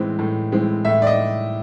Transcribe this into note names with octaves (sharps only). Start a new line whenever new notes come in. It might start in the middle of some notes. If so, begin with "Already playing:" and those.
Already playing: A2 E3 G#3 C4
A2
E3 G#3 C4
A2 E5
D5
D#5